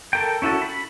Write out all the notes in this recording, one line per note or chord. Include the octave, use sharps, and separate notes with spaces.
A4 A#4 G5
C#4 E4 F#4 A4
B5